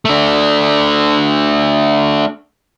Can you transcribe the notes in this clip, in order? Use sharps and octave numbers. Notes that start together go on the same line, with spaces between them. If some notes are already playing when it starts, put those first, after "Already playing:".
A3 D4